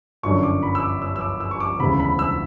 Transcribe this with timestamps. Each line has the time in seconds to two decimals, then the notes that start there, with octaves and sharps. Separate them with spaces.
0.23 G1 F#2 D3 F#3 C#6
0.43 D6
0.63 B5
0.75 E6
0.83 D6
1.02 E6
1.16 E6
1.21 D6
1.40 E6
1.51 C#6
1.60 D6
1.80 E1 D2 C#3 B5
2.00 B5
2.19 E6